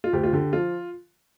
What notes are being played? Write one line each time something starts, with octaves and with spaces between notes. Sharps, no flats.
F4
D2 G4
F4
D3 G4
F3 F4